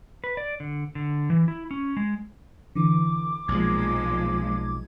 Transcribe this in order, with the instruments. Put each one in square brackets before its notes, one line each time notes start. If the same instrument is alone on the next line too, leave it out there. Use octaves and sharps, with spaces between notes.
[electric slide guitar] B4
D5
D3
D3
E3
E4
C#4
G#3
[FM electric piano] D3 E3 [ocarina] D6
[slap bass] B1 [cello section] A#2 F3 G#3 [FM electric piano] G#6